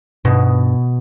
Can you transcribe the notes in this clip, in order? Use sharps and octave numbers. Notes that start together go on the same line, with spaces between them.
G2 B2